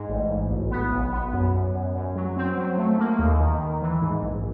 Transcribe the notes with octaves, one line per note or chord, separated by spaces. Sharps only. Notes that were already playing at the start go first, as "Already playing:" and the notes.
Already playing: G#2
A1
A1
B1
B3
B1
B3
F#2
F#2
F#2
F#2
F#3
C4
F#3
A3
A#3
D#2
D#3
D#3
E3
G#2
A#1